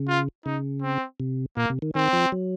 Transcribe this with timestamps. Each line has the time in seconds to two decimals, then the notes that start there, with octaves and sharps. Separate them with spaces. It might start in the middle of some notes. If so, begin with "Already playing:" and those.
Already playing: C#3
0.09 F4
0.46 C#3 D#4
0.83 C4
1.20 C3
1.57 A#2 A#3
1.70 C3
1.82 D#3
1.95 D#3 C4
2.13 F3
2.32 F#3